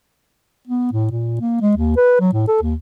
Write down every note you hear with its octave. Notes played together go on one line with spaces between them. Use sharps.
B3
A2
A#2
A#3
G#3
D#2
B4
F#3
A2
A4
D#2